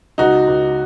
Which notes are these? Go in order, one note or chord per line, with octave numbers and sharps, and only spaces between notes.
C#2 D#4 F#4
C#2